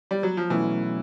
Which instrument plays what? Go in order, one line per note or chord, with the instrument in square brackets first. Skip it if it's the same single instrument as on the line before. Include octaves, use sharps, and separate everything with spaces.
[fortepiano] G3
F#3
F3
[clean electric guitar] B2 F#3 A3 C#4 E4 [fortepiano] E3